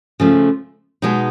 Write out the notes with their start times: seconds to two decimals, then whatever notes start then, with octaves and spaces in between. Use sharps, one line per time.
0.20 C#3 F3 A3
1.02 B2 G#3 B3 D#4